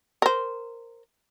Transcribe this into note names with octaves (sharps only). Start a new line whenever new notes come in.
A#4 C5